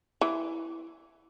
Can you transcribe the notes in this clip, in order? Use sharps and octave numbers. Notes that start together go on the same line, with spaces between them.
E3